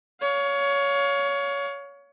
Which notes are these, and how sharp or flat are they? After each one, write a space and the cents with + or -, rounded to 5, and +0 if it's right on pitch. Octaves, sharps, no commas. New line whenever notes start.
C#5 +20 F5 +25